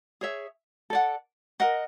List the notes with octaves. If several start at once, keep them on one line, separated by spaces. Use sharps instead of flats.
G#4 C#5 E5
A4 D5 F#5
A#4 D#5 F#5